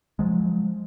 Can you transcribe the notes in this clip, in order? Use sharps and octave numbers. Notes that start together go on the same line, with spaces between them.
F3 F#3 G#3